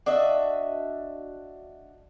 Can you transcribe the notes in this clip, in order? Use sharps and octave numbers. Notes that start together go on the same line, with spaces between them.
D4 F#4 D#5 E5